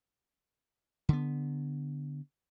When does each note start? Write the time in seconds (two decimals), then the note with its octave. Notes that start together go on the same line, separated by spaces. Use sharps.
1.09 D3 B3